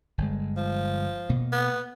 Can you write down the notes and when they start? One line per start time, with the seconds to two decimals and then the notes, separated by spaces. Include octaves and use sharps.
0.18 G1 G#3
0.57 F3
1.29 B2 A#3
1.53 B3